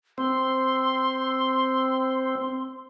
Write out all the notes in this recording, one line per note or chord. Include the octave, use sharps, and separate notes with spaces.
C4 C6